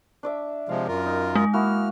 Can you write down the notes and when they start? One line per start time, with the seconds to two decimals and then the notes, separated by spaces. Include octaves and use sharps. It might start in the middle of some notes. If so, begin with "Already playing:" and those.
0.23 D4 D5 E5
0.69 C3 F3 G#3 F5
0.87 F#2 F4 A#4
1.06 D#4
1.35 G#3
1.53 A#3 E4 F#4 F6